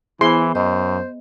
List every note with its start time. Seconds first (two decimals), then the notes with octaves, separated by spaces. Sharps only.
0.21 E3 B3 E4 G#4 C5 E5 C6
0.55 F#2 C5 D#5